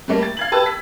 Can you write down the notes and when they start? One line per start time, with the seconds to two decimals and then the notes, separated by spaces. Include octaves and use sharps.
0.08 G3 A3 A#3
0.23 A6
0.37 F5 G#6 F#7
0.52 G4 B4 A5 E6
0.66 B6